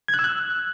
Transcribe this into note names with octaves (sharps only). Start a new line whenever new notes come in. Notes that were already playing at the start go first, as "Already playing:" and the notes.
G#6
F#6
E6
F#6